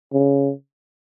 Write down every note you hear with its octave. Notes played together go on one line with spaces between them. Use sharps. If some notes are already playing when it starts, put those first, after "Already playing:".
C#3